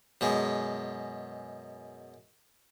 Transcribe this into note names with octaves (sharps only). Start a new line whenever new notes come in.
F#2 B2 G#3